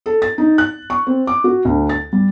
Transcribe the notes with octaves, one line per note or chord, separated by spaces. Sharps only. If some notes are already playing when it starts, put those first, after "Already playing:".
A4
A6
D#4
F#6
C#6
C4
D6
F#4
D2
A6
G3